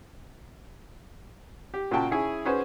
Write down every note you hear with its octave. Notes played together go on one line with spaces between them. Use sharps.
G4
A#2 C#3 F#4 G5 A5
C#4 E4 G#4
C#4 F#4 G#4 B4 C5